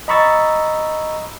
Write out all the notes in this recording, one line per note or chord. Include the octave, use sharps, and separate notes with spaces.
D#5 A#5 B5 C#6 E6 A6